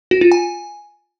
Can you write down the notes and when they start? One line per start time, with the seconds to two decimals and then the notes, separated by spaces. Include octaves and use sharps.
0.11 F#4
0.21 F4
0.32 G#5